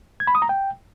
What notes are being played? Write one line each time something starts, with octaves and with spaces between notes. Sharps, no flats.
G#6
B5
D#6
A#5
G5